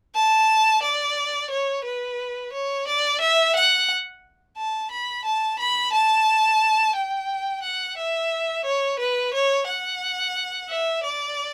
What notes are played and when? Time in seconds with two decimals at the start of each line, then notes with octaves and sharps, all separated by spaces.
0.15 A5
0.82 D5
1.51 C#5
1.85 B4
2.53 C#5
2.87 D5
3.21 E5
3.56 F#5
4.58 A5
4.91 B5
5.25 A5
5.59 B5
5.93 A5
6.96 G5
7.63 F#5
7.98 E5
8.65 C#5
8.99 B4
9.34 C#5
9.67 F#5
10.69 E5
11.03 D5